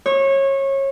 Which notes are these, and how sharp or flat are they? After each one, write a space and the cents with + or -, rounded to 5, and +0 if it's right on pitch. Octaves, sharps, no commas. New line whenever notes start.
C#5 -25